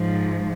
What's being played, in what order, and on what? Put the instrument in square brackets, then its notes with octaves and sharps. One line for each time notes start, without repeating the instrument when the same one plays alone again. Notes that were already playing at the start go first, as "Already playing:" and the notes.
Already playing: [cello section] G#2 F3